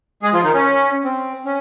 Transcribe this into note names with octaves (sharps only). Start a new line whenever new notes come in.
G#3 G#4
F3 F4
D#3 D#4
C#4
C4
C#4